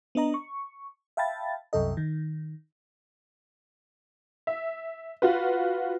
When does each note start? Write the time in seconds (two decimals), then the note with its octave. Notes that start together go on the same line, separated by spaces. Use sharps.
0.15 B3 D4 D#5 A#5
0.34 C#6
1.17 E5 F5 G5 A5 B5 A6
1.73 C2 F#2 C3 A4 D#5
1.97 D#3
4.47 E5
5.22 F4 F#4 B4